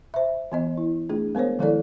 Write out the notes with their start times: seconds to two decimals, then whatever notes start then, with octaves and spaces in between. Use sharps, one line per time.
0.14 C5 E5
0.52 E3 B3 D#5
0.77 E4
1.09 A3 D4 F4 G#4
1.35 G#3 B3 A#4 C5 C#5
1.59 D#3 F3 G#3 E4 A4 D5